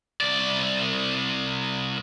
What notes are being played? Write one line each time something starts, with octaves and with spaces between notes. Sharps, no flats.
C2 D5